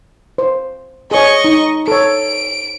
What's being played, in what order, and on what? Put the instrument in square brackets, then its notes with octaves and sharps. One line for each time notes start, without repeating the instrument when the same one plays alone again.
[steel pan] C5
[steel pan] G#4 C#5 [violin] D#5 C#6
[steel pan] D#4
[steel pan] A4 C#5 [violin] D7